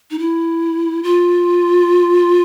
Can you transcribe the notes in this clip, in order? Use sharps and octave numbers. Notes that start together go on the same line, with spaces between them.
D#4
E4
F4